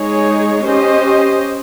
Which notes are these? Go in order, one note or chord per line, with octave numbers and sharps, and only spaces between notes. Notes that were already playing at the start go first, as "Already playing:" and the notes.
Already playing: G#3 D#4 G#4 C#5
C#4 G4 C5 D#5